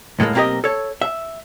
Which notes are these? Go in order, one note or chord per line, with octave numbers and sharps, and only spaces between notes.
C#2 A2 D#3 G#3 A#3
B1 A#3 C4 G4 A#4 D#5
A4 C#5
E5